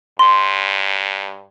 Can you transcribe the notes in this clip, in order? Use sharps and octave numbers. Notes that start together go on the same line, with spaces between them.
G2 C6